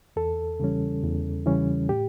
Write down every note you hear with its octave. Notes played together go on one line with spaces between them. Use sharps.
E2 A4
C#3 E3 G3 C#4
E2
C#3 E3 G3 C#4
A2 G4